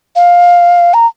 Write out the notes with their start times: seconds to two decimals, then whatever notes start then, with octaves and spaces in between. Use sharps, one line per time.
0.16 F5
0.94 A#5